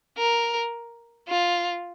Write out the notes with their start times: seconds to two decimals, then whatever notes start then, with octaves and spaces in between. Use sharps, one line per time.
0.18 A#4
1.28 F4